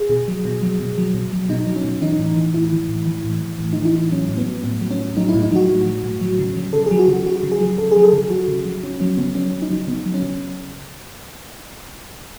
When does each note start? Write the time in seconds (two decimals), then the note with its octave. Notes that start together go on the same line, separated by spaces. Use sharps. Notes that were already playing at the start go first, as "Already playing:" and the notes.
Already playing: G#4
0.10 B2
0.28 F#3
0.45 B2
0.62 F#3
0.80 B2
0.98 F#3
1.14 B2
1.33 F#3
1.49 B2 D#4
1.67 F#3
1.76 C#4
1.84 B2
2.02 E3 D#4
2.19 A2
2.36 E3
2.54 A2 E4
2.73 E3
2.89 A2
3.06 E3
3.25 A2
3.42 E3
3.59 A2
3.73 D#4
3.77 E3
3.85 E4
3.94 A2
4.11 F#3 C#4
4.29 A2
4.38 B3
4.47 F#3
4.63 A2 B3
4.81 F#3
4.91 C#4
4.99 A2
5.17 F#3 D#4
5.29 E4
5.34 A2
5.42 D#4
5.52 F#3 F#4
5.69 A2
5.86 F#3
6.04 A2
6.21 F#3
6.39 C#3
6.57 F#3
6.73 C#3 A4
6.86 G#4
6.91 F#3
6.99 F#4
7.08 C#3
7.13 F#4
7.26 F#3 F#4
7.43 C#3
7.52 G#4
7.61 F#3
7.78 C#3 A4
7.91 G#4
7.96 F#3
8.04 A4
8.13 C#3 G#4
8.30 F#3 F#4
8.48 C#3
8.65 F#3
8.84 C#3 C#4
9.00 F#3 C#4
9.17 C#3 B3
9.35 F#3 C#4
9.53 C#3
9.62 D#4
9.70 F#3
9.87 C#3 B3
10.06 F#3
10.14 C#4
10.22 C#3